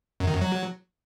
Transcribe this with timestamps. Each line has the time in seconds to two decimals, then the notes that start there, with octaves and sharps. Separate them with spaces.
0.20 F#2
0.27 D#3
0.34 F#2
0.41 F#3